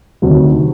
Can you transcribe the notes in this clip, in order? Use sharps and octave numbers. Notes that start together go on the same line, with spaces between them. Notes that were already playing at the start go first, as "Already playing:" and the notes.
D2 C3 D#3 F#3